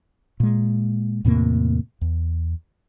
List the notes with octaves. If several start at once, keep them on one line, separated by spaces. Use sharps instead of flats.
A#2 G#3
E2 A2 C3 A#3
E2